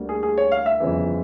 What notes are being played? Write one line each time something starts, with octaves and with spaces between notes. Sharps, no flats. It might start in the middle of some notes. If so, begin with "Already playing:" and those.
Already playing: D2 D3 G3 A#3
G#4
G#4
C#5
F5
E5
G1 F2 C#3 E3